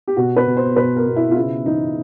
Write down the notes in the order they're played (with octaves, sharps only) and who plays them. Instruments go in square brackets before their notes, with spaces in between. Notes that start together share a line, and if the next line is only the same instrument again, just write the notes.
[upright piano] G4
B2 F#4
B4
B2
C5
B2 B4
A#4
B2
E4
F4
C#3 E4
E3 D#4